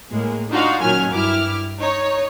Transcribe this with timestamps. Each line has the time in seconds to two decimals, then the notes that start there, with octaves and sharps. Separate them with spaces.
0.11 A2 G#3 A#3
0.50 D4 D#4 F4 F#4 F5
0.80 A#2 D#3 F#3 C#4 G#5 F6
1.10 G2 E4 D6 F6
1.80 D#4 C#5